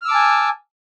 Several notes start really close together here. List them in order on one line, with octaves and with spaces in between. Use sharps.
F6 E6 D6 A5 G#5